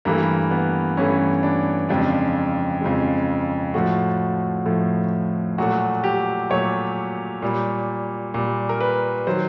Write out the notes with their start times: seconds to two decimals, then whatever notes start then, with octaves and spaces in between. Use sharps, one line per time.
0.05 G2 E3 A3 A#3
0.51 B3
0.97 G2 E3 A3 C#4
1.43 D4
1.89 F2 C#3 F3 G#3 D4
2.81 F2 C#3 F3 G#3
3.74 A2 F3 A3 F#4
4.66 A2 F3 A3
5.58 A#2 F#3 A3 F#4
6.04 G4
6.50 A#2 F#3 A3 C#5
7.42 A#2 G3
8.34 A#2 G3
8.69 A#4
8.81 B4
9.27 D#3 F#3 C5